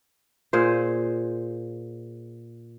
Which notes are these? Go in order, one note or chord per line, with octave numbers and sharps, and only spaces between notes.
A#2 G#4 C5